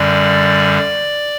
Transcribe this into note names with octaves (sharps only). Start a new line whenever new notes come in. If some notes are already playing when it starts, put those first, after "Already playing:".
Already playing: F#2 D3 G3 D5